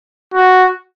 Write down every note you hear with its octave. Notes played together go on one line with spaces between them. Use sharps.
F#4